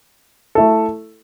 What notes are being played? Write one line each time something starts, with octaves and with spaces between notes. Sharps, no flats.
A3 E4 A4